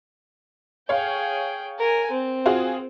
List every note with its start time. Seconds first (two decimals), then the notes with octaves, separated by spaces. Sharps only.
0.89 G#4 C#5 F5 G5
1.79 A#4 G#5
2.11 C4
2.46 F4 F#4 G#4